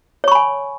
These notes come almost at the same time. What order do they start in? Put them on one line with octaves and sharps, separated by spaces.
C#5 C#6 B5 G#5